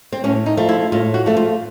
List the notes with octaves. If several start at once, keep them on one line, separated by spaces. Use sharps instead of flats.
C4
A2 C#4
D#4
F3 A3
E4
A2 F4
F#4
F3 A3
F4